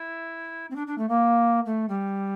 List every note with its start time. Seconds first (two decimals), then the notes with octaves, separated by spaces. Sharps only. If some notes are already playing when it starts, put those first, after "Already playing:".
Already playing: E4
0.70 C4
0.76 D4
0.87 D4
0.98 A3
1.09 A#3
1.65 A3
1.89 G3